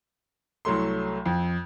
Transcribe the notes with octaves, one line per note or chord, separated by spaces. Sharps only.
C2 F#3 A3 C6
F2